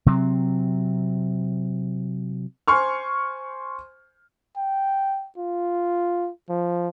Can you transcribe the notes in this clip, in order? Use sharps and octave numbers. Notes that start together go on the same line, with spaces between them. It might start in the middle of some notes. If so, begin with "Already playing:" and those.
C3 F#3 C4
C5 G#5 C6 C#6 F6
G5
F4
F3